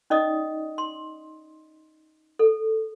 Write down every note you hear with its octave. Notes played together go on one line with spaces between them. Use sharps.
C#4 D#4 D5 D#5 D#6
C6
A4